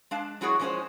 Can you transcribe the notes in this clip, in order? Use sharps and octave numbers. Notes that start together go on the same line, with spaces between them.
G#3 D4 F5 A5
F#3 G#3 E4 F#4 G#4 C#5
F3 G#3 C#4 D4 G#4 C5